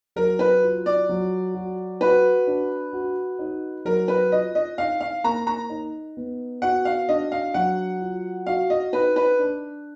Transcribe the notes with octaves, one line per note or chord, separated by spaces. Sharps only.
F#3 A#4
B4
F4
D5
F#3
F#4
F#4 B4
D4
F#4
D#4
F#3 A#4
B4
F4 D#5
D#5
D#4 F5
F5
A#3 A#5
A#5
D#4
B3
F#4 F#5
F5
D4 D#5
F5
F#3 F#5
F4
F#4 F5
D#5
D#4 B4
B4
D4